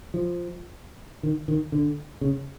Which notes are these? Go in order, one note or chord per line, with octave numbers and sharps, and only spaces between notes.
F3
D#3
D#3
D3
C#3